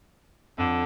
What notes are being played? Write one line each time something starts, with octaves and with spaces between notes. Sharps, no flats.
F2 D3